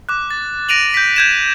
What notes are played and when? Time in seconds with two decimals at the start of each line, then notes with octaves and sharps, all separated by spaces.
0.09 D6 F#6
0.31 A6
0.69 A#6 D7 D#7 F7 F#7
0.94 G6 B6
1.16 G6 G#6 E7